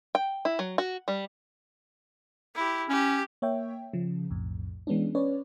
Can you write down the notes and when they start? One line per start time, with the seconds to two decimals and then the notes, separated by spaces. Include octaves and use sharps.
0.15 G5
0.45 E4
0.59 F#3
0.78 F#4
1.08 G3
2.55 E4 G4
2.89 C#4 G4
3.42 A#3 C#5 E5 G5
3.93 C#3 F3
4.30 B1 F2 A2
4.87 E3 G#3 B3 C#4 D4
5.15 C#4 B4 C#5 D5